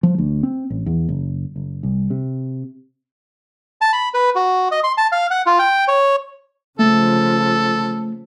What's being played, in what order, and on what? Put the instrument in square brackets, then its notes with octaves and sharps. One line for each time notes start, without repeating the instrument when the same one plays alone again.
[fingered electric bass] F3
D2
C4
A1
E2
F#1
F#1
C2
C3
[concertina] A5
B5
B4
F#4
D#5
C6
A5
F5
F#5
F4
G5
C#5
[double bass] C#3 F3 [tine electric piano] A3 [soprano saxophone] A4